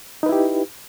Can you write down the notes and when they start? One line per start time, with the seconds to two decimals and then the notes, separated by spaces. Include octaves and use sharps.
0.23 D#4
0.26 B4
0.29 E4
0.32 G4